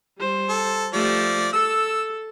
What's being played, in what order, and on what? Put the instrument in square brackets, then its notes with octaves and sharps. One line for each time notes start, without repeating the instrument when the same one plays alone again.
[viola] G3 C5
[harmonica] A4
[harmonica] F3 D5 [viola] A3 G4
[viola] A4 [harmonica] E6